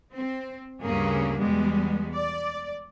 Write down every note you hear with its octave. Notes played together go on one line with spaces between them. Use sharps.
C4
D2 G2 C#3 A#3 C#4 G#4
E2 B2 G3 G#3 B3
D5